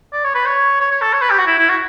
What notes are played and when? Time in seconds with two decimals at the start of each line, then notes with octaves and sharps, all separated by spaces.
0.13 D5
0.24 C#5
0.35 B4
0.46 C#5
0.80 C#5
0.91 C#5
1.02 A4
1.13 C#5
1.22 B4
1.30 G4
1.38 F#4
1.47 E4
1.58 E4
1.70 F#4